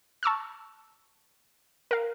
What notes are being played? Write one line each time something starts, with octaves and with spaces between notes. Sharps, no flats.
A5 C#6 E6 F6
A#4 F5